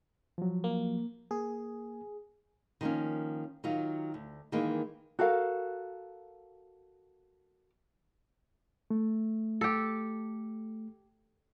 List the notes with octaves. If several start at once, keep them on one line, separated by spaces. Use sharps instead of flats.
F3 F#3
A#3
A#3 G#4
D#3 F3 G3 A#3 C#4
D#3 F#3 F4
D2
D#3 E3 G#3 A#3
F#4 A4 A#4 F5
A3
G4 A4